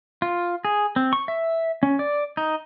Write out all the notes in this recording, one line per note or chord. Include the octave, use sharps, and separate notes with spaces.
F4
G#4
C4
C#6
E5
C#4
D5
D#4